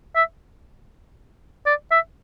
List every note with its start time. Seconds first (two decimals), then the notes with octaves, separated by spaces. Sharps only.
0.15 E5
1.66 D5
1.91 E5